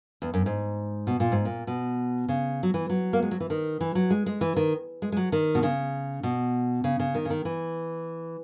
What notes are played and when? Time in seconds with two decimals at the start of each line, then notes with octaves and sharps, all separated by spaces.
0.22 E2
0.34 F#2
0.46 G#2
1.07 B2
1.20 A#2
1.32 G#2
1.45 A#2
1.67 B2
2.28 C#3
2.63 F#3
2.74 E3
2.89 F#3
3.13 A#3
3.23 G#3
3.31 F#3
3.40 E3
3.50 D#3
3.81 E3
3.95 F#3
4.10 G#3
4.26 G#3
4.41 E3
4.56 D#3
5.02 G#3
5.12 G#3
5.17 F#3
5.32 D#3
5.55 B2
5.63 C#3
6.23 B2
6.84 C#3
6.99 C#3
7.15 D#3
7.25 C#3
7.30 D#3
7.45 E3